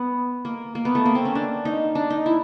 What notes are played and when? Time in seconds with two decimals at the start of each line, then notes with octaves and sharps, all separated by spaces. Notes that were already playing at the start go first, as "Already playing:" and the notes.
Already playing: B3
0.45 A#3
0.75 A#3
0.85 B3
0.95 A3
1.05 A#3
1.15 C4
1.25 C#4
1.35 D4
1.65 D#4
1.95 D4
2.10 D#4
2.26 E4